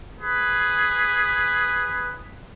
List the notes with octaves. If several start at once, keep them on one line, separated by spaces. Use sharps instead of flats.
G#4 B4